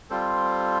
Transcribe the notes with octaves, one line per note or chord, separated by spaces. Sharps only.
G3 C4 F4 A4 C5